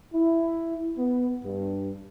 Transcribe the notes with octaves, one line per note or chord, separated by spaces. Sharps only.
E4
B3
G2